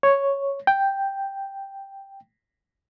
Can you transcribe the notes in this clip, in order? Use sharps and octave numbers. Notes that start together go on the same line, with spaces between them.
C#5
G5